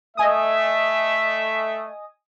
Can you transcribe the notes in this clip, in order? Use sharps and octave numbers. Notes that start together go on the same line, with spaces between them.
A3 D#5 E5 G#5 D#6